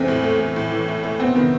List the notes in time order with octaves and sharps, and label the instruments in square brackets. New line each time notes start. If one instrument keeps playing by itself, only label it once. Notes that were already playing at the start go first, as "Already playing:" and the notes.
Already playing: [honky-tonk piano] E2 A3 [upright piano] C4
[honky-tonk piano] A2
A3
A2
A2
E3
A3
A3
[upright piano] B3 [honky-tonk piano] C4
[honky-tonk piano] D#3 [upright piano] B3